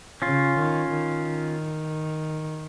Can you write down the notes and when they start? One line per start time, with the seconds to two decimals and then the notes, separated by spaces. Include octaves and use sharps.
0.22 C#3 C#4 F4
0.57 D#3
0.91 D#3